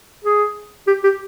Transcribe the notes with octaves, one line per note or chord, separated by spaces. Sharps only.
G#4
G4
G4